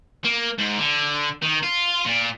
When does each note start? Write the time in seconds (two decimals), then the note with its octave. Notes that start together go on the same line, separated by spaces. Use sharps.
0.24 A#3
0.58 G#2
0.78 D3
1.42 D#3
1.63 F4
2.05 A#2